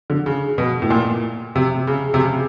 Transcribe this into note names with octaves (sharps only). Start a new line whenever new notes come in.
D3
C#3
B2
A2
A#2
C3
C#3
C3
C#3